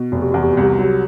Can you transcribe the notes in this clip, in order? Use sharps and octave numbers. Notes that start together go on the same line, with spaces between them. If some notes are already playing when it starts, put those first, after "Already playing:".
Already playing: B2
F1 F#4
G4
E2 F#4
G4
C2 F#4
G4
F#4
F#3 G4